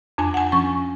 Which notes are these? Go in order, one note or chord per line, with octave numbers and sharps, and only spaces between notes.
F2 D4 G#5
F#5 G#5
F3 C#4 C#6